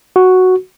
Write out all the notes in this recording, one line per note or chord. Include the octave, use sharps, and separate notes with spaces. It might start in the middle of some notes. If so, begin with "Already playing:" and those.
F#4